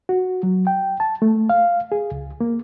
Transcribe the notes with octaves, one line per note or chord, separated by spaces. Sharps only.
F#4
F#3
G5
A5
A3
F5
G#4
C#2
A#3